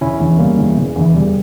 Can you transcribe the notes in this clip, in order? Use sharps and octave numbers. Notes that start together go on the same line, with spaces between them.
E1 C#4 E4
E2 E3
E1 G3 A#3
E2 E3
E1
E2 E3
E1 G3